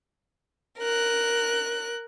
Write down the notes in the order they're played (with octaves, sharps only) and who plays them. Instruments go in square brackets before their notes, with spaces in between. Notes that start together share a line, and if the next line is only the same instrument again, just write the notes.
[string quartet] A#4 F#6